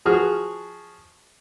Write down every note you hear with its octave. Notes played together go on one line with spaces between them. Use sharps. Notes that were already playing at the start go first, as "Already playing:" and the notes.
F3 F#4 G#4 F6